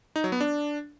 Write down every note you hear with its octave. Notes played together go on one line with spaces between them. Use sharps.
D#4
F#3
B3
D4